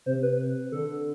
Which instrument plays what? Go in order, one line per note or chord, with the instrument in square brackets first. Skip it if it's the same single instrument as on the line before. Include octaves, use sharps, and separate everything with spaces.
[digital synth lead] C3 [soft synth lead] C5
[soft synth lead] B4
[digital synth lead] D3 [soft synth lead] A4